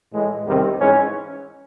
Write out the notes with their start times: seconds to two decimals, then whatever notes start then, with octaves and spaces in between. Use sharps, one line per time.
0.12 A2 E3 G#3
0.46 E2 C3 D#3 G3 C4
0.79 G#2 E3 G#3 C#4